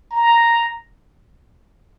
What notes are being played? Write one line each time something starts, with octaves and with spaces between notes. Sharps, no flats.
A#5